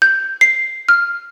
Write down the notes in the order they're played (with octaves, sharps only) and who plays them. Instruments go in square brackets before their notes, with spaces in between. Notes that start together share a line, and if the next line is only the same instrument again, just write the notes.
[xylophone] G6
C7
F6